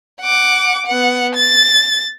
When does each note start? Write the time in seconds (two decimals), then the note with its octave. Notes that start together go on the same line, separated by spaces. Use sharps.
0.21 F#5 D6
0.86 B3 F#5
1.36 A6